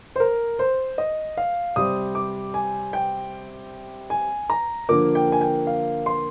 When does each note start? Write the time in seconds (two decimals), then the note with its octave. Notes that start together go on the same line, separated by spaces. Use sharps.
0.16 C5
0.20 A#4
0.59 C5
0.98 D#5
1.37 F5
1.76 C3 G3 C4 D#6
2.15 D6
2.54 G#5
2.93 G5
4.10 G#5
4.50 A#5
4.89 D3 F3 A#3 D6
5.15 G5
5.32 G#5
5.41 G5
5.67 F5
6.06 C6